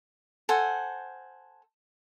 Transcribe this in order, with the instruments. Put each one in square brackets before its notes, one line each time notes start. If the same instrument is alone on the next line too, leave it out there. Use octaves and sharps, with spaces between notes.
[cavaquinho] A4 C5 F#5 G#5